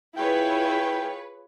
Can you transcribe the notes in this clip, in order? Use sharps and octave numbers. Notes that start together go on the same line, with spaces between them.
E4 F4 G#4 B4 C#5 G5